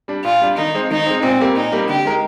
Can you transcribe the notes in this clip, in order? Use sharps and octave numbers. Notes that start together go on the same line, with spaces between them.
G3 D4
A#2 F4
G3 D4
D#3 D#4
G#3 C4
D#3 D#4
G#3 C4
A#2 C4
G3 A#3
A#2 D#4
G3 A#3
D3 G4
G#3 D#4 A#4